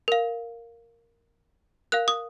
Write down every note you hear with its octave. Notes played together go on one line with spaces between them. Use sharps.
A#4 F5
A#4 F5 F#6
D#6